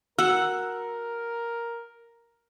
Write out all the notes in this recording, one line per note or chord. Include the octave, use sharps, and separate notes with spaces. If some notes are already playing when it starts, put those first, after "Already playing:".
F#4 A#4 F#5 E6